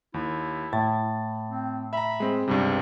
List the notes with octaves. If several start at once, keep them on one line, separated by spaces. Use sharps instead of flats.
D#2 E4
A2 A6
C4
E5 A#5 B5
G#3 C4
C#2 G2 C3 G3